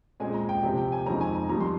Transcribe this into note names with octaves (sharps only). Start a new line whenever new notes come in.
A#2 G#3 C4 G#5
A#5
G5
C3 F3 C4
G5
G#5
F2 D#3 G#3 C4 A#5
G#5
A#5
F2 D#3 G3 A#5
C6